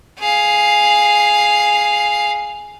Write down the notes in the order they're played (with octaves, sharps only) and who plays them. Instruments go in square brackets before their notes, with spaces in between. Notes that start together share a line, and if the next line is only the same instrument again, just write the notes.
[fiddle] G#4 F5